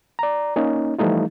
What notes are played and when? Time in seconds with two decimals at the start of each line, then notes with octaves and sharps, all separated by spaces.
0.19 D5 A#5
0.56 A#3 C#4 D#4
0.99 E3 F3 G3 A3 D#4 F4